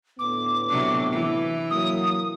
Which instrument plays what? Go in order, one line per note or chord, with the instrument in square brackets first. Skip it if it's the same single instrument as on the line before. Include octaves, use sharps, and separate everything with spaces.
[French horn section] D2 A2 B3 [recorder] D6
[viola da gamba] C3 F#3 D4
E3 E4
[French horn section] F#3 A#3 [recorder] D#6